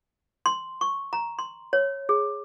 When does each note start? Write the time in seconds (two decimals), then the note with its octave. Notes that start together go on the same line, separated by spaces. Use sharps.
0.46 C6
0.81 C#6
1.13 A#5
1.39 C6
1.73 C#5
2.09 G#4